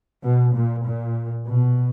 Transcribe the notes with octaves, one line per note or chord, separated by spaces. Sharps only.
B2
A#2
A#2
B2